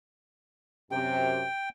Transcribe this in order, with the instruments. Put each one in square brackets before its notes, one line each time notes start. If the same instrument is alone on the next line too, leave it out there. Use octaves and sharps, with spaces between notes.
[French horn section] F#2 C3 [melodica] G5